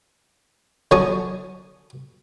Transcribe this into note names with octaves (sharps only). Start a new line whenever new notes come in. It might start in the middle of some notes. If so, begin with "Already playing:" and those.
D3 F#3 C#4 A5 C#6 D#6